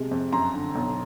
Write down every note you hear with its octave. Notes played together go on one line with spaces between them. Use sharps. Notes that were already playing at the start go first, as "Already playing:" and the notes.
Already playing: C3 G#3
F2
F#2 A#5 C6
D3
B1